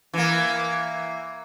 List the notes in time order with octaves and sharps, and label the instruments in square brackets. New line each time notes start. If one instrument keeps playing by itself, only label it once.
[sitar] E3 A#3